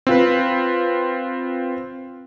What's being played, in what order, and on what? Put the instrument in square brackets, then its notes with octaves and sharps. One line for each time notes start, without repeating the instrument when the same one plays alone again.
[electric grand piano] C4 F4 B4